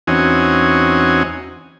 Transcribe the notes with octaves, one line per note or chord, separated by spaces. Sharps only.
E2 C4 C#4 D#4 F#4 G#5